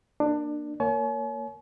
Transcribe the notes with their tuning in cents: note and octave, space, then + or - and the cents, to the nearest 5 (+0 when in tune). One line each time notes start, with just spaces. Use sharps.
A#3 +0 D4 +20
A#3 -10 C#5 +15 G#5 +45